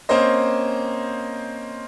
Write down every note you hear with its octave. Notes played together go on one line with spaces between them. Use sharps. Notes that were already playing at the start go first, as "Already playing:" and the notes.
A#3 C4 C#4 C5 D#5